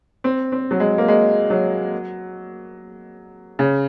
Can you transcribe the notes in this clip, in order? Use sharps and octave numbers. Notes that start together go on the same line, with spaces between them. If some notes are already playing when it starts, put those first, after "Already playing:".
C4
C4
F#3
G#3
A#3
G#3
F#3
C#3